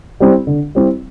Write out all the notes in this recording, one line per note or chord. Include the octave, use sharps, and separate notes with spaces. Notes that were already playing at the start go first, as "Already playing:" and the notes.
G3 C4 E4
D3
G3 C4 E4